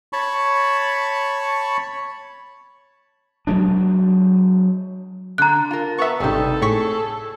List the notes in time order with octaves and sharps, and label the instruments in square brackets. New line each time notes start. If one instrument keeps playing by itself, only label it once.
[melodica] C#5 A5 B5 C#6
[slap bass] F#3 G#3 D4
[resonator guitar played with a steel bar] D3 [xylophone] A#5 F#6
[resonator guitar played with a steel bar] F4 A#4
[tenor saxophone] B3 [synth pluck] E5 C#6
[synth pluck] G#1 C3 [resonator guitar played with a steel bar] G3 D#4 [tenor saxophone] A4
[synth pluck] A2 C#6 B6 [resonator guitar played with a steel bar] G#4